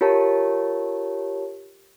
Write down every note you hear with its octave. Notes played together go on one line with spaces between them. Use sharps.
F4 G4 A#4 C#5 A5